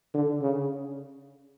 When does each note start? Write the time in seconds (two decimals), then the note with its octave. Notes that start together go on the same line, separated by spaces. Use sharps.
0.14 D3
0.42 C#3